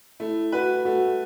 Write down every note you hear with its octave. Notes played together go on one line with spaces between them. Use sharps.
A3 E4
F#4 B4
A3 F#4